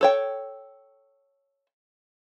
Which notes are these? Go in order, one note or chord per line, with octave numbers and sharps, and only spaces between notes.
A4 C#5 G5